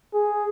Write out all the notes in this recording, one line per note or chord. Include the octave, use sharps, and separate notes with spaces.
G#4